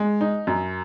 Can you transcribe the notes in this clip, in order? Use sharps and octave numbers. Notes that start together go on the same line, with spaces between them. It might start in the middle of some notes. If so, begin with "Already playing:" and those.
Already playing: G#3
D#4
F#2